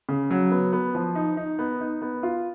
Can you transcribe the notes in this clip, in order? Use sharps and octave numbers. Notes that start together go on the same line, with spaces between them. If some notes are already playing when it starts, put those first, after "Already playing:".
C#3
F#3
B3
B3
F3
D#4
D#4
B3
D#4
B3
F4